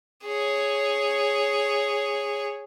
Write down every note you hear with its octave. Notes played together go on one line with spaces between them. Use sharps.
G#4 C#5